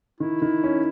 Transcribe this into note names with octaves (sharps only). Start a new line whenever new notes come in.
D#3 E4
D#3
C#4